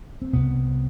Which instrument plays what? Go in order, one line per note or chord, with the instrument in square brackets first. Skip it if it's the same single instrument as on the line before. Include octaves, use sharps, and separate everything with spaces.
[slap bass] C4
C2 C3 B3